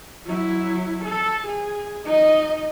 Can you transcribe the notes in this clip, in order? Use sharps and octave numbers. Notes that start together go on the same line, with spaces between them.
F#3 E4
A4
G#4
D#4 D#5